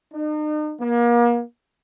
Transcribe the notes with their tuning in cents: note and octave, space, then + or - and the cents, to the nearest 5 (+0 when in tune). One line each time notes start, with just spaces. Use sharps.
D#4 -40
A#3 +35